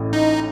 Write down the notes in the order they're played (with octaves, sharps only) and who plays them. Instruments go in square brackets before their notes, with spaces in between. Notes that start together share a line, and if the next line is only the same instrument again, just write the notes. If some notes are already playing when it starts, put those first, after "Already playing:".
Already playing: [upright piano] A1 A2 A3
[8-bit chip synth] D#4